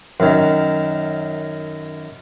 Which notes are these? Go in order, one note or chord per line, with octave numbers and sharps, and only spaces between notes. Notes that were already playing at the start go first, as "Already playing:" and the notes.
F#2 D#3